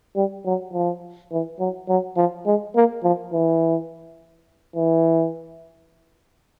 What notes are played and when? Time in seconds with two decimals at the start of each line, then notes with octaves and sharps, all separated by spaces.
0.16 G3
0.46 F#3
0.73 F3
1.32 E3
1.59 F#3
1.89 F#3
2.17 F3
2.46 G#3
2.75 A#3
3.04 F3
3.33 E3
4.76 E3